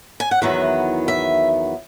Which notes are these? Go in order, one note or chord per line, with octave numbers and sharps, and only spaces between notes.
G#5
F#5
E2 D#3 F#3 B3 E5
E5